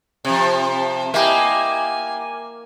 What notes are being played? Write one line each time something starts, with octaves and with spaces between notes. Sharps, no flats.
C3 F3
A#3 E4 G4 D#5 G#5